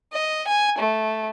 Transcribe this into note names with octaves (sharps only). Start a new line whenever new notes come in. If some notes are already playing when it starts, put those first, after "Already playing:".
D#5
G#5
A3